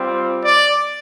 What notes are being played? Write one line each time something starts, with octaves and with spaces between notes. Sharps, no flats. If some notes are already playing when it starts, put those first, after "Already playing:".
Already playing: G3 C4 F4
D5